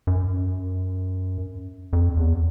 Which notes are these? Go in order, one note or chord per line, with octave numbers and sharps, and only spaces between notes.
F#2
F2
E2